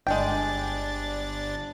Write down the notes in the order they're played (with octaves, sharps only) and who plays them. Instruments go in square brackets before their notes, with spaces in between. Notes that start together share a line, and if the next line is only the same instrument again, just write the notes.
[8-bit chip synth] G1 D4 A6 [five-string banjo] G#3 G5